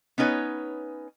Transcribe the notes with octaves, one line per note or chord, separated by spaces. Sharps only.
B3 C#4 D#4 B4 C#5